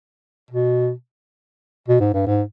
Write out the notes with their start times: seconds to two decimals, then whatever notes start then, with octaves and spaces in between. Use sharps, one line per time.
0.51 B2
1.88 B2
2.00 G#2
2.14 G2
2.26 G#2